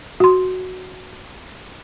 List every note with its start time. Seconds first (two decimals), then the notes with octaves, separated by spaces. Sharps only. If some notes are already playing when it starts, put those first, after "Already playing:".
0.20 F#4 C6